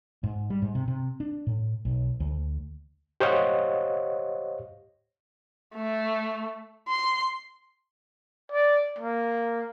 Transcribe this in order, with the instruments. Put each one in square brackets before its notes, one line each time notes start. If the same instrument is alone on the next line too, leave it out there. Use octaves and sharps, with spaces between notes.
[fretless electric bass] G#2
G3
G#2
C3
C3
D4
A2
B1
D2
[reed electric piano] G4 C5 C#5 D#5 F5 F#5
[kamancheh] A3
C6
[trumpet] D5
A#3